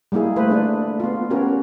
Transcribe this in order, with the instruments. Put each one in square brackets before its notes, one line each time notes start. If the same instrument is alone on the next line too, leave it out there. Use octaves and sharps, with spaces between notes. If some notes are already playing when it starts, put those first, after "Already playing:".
[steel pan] G3 G#3 A#3 E4 G#4
A3 B4 C5
A3 D4 G#4
B3 F4
B3 C#4 F#4 G4 A#4